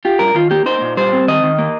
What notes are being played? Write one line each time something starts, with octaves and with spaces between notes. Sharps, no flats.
F4 G4
G2 A#4
D#3 F4
A#3 G4
D#4 C5
A#2
G3 C5
C4
D#3 D#5
D#3
A#3